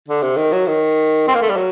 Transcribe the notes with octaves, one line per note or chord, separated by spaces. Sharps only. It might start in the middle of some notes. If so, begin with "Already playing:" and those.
D3
C3
D#3
F#3
D#3
C4
A#3
A3
G3
F#3